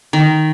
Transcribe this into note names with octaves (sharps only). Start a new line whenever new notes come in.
D#3